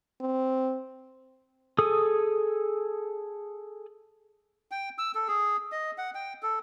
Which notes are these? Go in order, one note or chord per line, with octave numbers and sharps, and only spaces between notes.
C4
G#4 A4 D#6
G5
E6
A4
G#4
D#5
F#5
G5
A4